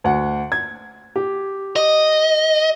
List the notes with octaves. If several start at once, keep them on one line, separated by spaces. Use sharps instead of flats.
D2 F#5
G#6
G4
D#5